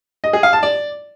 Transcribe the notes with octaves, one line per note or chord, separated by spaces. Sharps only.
D#5
G#4
F5
A5
D5